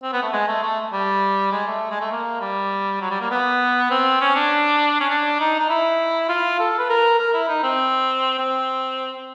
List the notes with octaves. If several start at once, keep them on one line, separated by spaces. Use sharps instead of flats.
C4
B3
A3
G#3
A3
A3
G3
G#3
A3
G#3
A3
A#3
G3
F#3
G3
A#3
B3
C4
C#4
D4
C#4
D4
D#4
D#4
E4
F4
A4
B4
A#4
A#4
E4
D#4
C4
C4